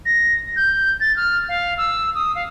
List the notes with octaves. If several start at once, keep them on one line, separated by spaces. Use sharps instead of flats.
A#6
G6
A6
F6
F5
E6
D#6
F5